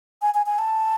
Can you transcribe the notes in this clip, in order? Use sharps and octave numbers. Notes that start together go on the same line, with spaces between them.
G#5
G#5
G#5
A5